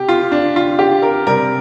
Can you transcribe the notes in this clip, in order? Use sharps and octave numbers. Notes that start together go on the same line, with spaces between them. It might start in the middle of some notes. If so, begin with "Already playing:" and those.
Already playing: C3 G4
F4
D4
F4
G4
A#4
C3 G3 A#4